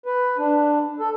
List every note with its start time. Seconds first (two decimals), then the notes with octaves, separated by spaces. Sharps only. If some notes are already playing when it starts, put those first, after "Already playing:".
0.06 B4
0.38 D4
1.00 A4